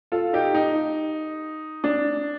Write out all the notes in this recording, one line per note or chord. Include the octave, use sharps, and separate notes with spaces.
F4 A4
D#4 G4
D#4
D4